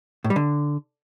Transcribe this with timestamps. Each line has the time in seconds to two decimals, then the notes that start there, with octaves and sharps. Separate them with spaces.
0.24 A2
0.30 G3
0.36 D3